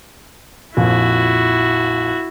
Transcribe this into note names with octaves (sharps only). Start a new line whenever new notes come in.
A#1 F2 E4 F#4